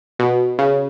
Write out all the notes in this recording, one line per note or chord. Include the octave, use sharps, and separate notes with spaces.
B2
C#3